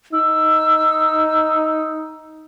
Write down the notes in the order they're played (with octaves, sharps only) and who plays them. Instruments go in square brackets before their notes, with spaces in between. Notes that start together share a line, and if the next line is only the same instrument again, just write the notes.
[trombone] D#4 [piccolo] E6